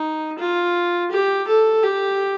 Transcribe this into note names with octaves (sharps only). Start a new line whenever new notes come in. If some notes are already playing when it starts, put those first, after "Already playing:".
Already playing: D#4
F4
G4
A4
G4